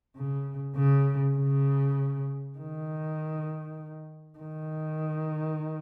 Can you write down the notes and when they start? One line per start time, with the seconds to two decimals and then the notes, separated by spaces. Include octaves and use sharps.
0.16 C#3
0.76 C#3
1.36 C#3
2.58 D#3
4.39 D#3